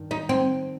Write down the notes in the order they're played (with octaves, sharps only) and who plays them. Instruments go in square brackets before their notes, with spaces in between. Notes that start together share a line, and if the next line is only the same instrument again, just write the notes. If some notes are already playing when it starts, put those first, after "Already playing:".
Already playing: [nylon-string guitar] G2 D#3
[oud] D#4
C4